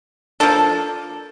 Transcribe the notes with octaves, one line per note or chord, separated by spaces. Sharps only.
F3 A#3 D4 A4